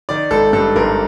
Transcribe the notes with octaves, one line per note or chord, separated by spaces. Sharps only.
D#3 D5
G#1 A4
G2 A4
G#1 A#4